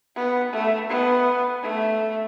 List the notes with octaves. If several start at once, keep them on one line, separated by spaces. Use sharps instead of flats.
B3
A3
B3
A3